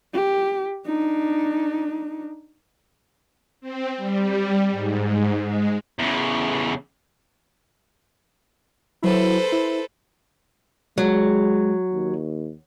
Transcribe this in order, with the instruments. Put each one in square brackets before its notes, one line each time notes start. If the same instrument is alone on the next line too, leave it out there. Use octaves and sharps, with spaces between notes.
[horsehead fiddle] G4
D4 D#4
[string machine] C4
G3
G#2
G#3
[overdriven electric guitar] E2 C#3
[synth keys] F#3 E4 [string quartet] A4 B4 C5
[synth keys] E4
[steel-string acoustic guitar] F#3 [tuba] G#3
[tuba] D#2